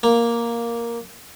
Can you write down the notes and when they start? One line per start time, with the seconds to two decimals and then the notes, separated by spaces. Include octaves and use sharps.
0.03 A#3